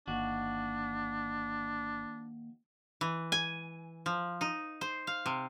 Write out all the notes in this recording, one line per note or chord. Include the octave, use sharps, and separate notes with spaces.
G1 D#2 D4 F#4
E3
G#5
F3
D#4
C5
F5
C3